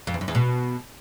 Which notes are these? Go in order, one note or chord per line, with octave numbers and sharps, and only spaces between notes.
F2
E2
F#2
E2
B2